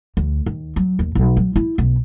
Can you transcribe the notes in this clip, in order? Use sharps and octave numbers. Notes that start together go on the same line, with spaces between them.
D2
D#2
F#3
D#2
B1
F#3
E4
B1